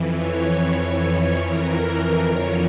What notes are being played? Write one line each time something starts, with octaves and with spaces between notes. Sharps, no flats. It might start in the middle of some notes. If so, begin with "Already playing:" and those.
Already playing: F2 E3
C#5
C#5
C#5
C#5
A#4
A#4
F2 D3 F3 C#5